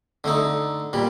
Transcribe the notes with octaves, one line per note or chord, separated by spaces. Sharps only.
D3 A3 D#4
A#2 G3